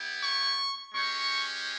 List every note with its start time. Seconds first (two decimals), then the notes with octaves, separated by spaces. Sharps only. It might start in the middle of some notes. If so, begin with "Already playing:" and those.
Already playing: B3 E4 G4
0.22 C#6
0.93 G#3 C#4 G4 C#6